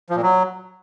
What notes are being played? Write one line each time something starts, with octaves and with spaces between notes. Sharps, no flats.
F3
A#2
F#3